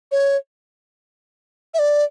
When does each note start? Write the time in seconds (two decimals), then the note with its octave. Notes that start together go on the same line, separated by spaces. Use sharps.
0.12 C#5
1.74 E5
1.79 D5